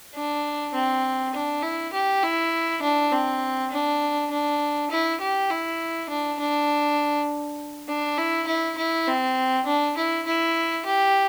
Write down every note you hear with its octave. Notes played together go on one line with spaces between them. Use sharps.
D4
C4
D4
E4
G4
E4
D4
C4
D4
D4
E4
G4
E4
D4
D4
D4
E4
E4
E4
C4
D4
E4
E4
G4